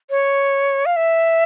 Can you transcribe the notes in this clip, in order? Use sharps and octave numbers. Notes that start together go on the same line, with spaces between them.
C#5
F5
E5